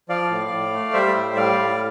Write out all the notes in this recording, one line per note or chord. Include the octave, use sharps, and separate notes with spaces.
F3 D5 F5
A2
A2
A3
G3 C5 E5
A2
G3 D5 F5
A2